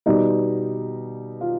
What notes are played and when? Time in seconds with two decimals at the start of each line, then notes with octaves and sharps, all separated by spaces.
0.06 B2 G3 B3 D#4 D#5
1.41 F4 F5